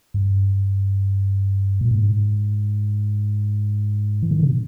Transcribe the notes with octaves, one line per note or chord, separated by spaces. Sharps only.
G2
A#2
G#2
E3
D#3
C#3
B2